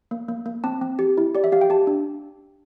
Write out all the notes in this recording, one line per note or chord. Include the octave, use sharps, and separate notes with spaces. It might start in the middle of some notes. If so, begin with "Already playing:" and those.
A#3
A#3
A#3
C4 A5
C4
G4
E4
G4 D5
E5
G4 F5
G5
G4 A5
D4